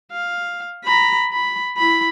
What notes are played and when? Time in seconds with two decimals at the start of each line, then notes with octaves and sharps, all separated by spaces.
0.12 F5
0.85 A#5 B5
1.32 B5
1.77 E4 B5